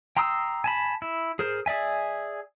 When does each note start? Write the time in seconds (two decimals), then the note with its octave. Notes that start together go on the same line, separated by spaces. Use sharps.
0.17 G5 A#5 C6 D#6 E6
0.64 G#5 A5 B5
1.02 E4
1.39 G#4 A#4 C5
1.66 G#4 D5 E5 G#5